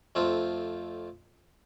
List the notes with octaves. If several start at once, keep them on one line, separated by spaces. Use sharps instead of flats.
F2 A3 C4 F4